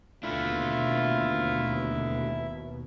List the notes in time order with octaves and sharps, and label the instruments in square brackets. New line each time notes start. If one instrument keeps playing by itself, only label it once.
[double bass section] D#2 B2 [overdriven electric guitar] A3 D4 [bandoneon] E4 E5 [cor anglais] F4